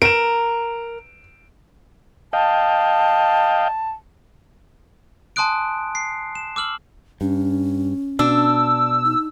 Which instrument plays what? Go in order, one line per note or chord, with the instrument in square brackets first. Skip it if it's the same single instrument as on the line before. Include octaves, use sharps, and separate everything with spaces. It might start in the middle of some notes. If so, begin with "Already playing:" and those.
[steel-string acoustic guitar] A#4 [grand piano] D7 E7
[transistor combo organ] D#5 F5 G5 [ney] A5
[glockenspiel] G#5 A5 C6 D#6 F#6 D7
C7
E7
D6 E6 F6 F#7
[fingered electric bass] G2 [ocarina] C#4
[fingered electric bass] B2 [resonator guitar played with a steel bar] D4 [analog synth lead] E6
[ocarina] D#4